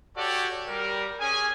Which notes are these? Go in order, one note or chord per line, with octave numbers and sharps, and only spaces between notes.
F#4 G4 A4 C#5 D5
G3 A#4
C#4 G#4 G#5